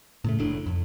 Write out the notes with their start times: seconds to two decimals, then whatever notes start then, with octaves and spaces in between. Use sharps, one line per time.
0.24 A2 C#3 A3
0.39 F1 A2 D4
0.66 F2